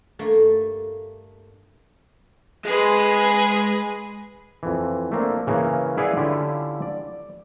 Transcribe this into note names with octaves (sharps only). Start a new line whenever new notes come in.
G2 A3 A#3
G#3 G#4 B4
F2 E3
A3 A#3 C4 D4
C#3 E3 A#3
E4 G#4 B4 D5 F5 F#5
D3 C#4 E4 F4 G4
D5